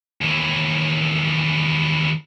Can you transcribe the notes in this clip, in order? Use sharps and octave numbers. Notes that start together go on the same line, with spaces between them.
D#2 E3